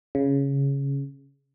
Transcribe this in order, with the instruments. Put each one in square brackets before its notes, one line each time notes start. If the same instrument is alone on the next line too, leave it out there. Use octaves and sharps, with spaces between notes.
[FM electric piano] C#3